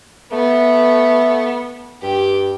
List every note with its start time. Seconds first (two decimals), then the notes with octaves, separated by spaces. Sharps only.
0.32 A3 B3
2.03 G2 G4